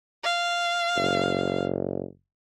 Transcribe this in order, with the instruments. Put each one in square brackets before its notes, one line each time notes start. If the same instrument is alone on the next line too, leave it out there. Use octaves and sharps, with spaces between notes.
[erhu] F5
[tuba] F#1